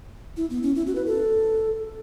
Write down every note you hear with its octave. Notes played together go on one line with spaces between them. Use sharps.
E4
B3
C#4
E4
F#4
B4
A4